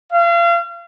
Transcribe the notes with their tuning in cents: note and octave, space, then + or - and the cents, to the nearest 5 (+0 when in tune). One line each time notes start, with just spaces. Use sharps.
F5 -35